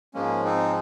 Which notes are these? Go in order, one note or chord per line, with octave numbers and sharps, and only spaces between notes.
G#2 F3 G#3 A#3 C#4
C4 D#4